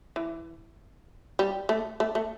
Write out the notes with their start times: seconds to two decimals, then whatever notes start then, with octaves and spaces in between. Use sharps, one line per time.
0.16 E3
1.39 G3
1.69 A3
2.00 A3
2.15 A3